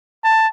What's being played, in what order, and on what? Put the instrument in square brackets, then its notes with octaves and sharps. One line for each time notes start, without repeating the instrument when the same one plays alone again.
[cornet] A5